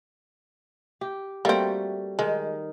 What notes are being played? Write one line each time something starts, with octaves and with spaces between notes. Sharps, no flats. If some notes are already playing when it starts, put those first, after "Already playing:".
G4
G3 A3 A#3 C4 F#4
D#3 G#3